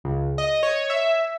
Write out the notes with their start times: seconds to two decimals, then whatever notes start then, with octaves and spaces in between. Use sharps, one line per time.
0.04 C#2
0.38 D#5
0.63 C#5
0.90 E5